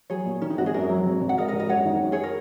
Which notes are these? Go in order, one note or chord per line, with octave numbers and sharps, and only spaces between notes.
F#3 G#4 C#5
A#2
D#3 C#4
D#4
G#1 F#4
G#4
F#2 A#4
F#3
G#1
G#1
F#5
G#3 A#4 D#5
A#4 D#5
G#1
A#4 D#5
F#2 C#5 F#5
D#3
F#2
G#4 C#5
A#4